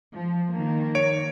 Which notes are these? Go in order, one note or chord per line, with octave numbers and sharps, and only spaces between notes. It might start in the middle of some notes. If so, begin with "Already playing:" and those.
F3
D#3 A#3
C#5 D7